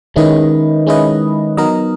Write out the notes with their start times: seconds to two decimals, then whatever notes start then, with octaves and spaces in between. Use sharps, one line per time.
0.16 D#3 G#3 C#4 E4 B4 D#5
0.87 G#3 C#4 E4 B4 D#5
1.57 F#3 B3 D#4 A#4 D#5